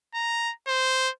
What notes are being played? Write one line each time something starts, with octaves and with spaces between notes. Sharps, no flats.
A#5
C5